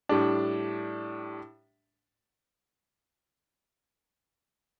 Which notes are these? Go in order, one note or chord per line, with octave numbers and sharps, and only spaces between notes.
A2 G3 D4